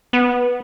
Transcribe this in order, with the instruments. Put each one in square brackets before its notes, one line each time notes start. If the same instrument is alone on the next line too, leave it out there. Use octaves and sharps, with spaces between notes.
[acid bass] B3